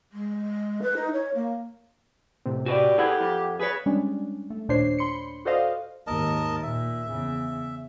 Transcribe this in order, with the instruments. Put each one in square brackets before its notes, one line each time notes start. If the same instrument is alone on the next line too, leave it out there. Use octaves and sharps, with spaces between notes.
[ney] G#3
B4
D#4
C#5
A#3
[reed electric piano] A2 C3 C4
[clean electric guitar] F#4 B4 D5 [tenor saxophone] G4
[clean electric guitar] E4 G#4 B4 [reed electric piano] A4 F#5 G#6
[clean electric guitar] F2
[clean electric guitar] G#4 C#5 [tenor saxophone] B4
[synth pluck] G3 G#3 C#4 D4
A3
D#2 A#2 D4 C5 C#5 C7
B5 C6 C#7
F#4 A4 C5 D5 D#5 F5
[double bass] D#2 G#2 [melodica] A#4 D#5 A5
[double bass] A#2 [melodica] E5
[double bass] E2 C#3